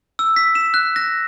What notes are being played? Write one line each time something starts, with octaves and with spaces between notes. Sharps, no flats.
E6
B6
E7
F#6
A#6